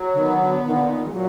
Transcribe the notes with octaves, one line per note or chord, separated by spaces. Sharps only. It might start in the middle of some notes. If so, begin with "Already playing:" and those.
Already playing: F#3
D3
D#3 B3
D3
A#2 D#3
D3
D#3
G#3
A#2 F#3